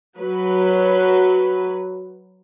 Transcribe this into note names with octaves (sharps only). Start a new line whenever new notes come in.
F#3 B4